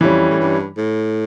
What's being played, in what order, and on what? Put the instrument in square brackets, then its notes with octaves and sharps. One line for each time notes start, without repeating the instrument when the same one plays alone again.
[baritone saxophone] F2 [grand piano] E3 G3 C#4
[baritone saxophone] A2
G2
A2